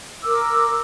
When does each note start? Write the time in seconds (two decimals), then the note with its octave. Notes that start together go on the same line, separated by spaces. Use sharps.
0.23 A#4 D6 E6